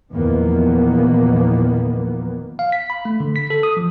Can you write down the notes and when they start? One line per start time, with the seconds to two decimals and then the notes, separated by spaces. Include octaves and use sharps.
0.13 E2 A#2 D#3 F3 A#3 B3
2.59 F5
2.72 B6
2.90 B5
3.05 A3
3.20 D3
3.36 B6
3.50 A4
3.63 D#6
3.77 F3